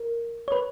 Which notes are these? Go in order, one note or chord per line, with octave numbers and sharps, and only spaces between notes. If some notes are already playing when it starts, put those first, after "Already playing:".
Already playing: A#4
C#5
B4